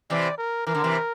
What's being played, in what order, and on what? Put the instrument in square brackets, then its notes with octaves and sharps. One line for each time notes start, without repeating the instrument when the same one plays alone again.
[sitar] C3 E3 [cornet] D5
[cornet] A#4
[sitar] E3 [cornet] A#4
[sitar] D3
C3 E3